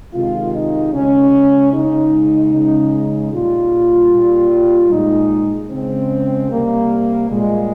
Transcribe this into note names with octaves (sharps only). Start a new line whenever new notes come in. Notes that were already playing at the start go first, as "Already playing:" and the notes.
C3 D#3 G#3 F4
D#4
C#3 G#3 C#4
C#3 G#3 D#4
C#3 G#3
A#2 G3 F4
A#2 G3
A#2 G#3 D#4
C#3 G#3 C4
C3 G3 A#3
A#2 G3 G#3